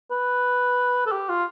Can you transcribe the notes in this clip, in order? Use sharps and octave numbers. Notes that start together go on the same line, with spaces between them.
B4
A4
G4
F4